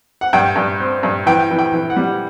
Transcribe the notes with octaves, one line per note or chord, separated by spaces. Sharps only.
F#5
G2 G5
G2
C4
G2
E3 G5
E3
G5
E3
F#5
G3